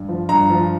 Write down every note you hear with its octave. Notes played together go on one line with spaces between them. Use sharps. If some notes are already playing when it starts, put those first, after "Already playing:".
Already playing: G2
F3
G2 A#5
F3